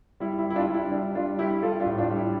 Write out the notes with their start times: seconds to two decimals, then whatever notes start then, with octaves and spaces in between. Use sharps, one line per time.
0.20 G3 E4
0.39 E4
0.44 G3
0.50 E4
0.56 D4 F4
0.68 G3
0.74 E4
0.91 G3 D4
1.15 G3 D4 F4
1.39 G3 E4 G4
1.62 G3 F4 A4
1.80 D4 F4
1.86 A2
1.98 D4 F4
2.10 G3
2.16 E4